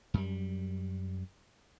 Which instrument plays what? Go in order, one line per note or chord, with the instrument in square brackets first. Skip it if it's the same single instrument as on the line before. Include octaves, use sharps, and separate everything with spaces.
[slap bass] F#2 G3